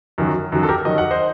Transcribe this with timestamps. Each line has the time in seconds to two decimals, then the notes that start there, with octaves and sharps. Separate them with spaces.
0.18 F#2 D#3 F#3
0.52 F#2 D#3 F#3
0.63 A4
0.69 G4 A#4
0.85 F#2 D#3 F#3 D#5
0.98 F#5
1.11 C5 D#5